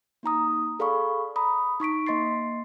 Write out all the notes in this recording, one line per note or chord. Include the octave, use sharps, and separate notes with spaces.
A#3 D#4 A#5 D#6
G#4 A4 D5 F5 B5 C#6
A#5 B5 D#6
D#4 C#6 B6 D7
A#3 D#5 C6 A6 C7